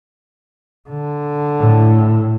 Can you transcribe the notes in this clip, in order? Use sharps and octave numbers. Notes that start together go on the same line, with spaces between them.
D3
A2